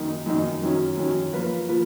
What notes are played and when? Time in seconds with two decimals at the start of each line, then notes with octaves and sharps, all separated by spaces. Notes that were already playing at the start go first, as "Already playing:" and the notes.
Already playing: F#2 D#3 A#3 D#4
0.26 F#2 D#3 A#3 D#4
0.61 F#2 D#3 F#3 C#4
0.97 F#2 D#3 F#3 C#4
1.33 F3 A#3 F4 B4
1.68 F3 A#3 F4 B4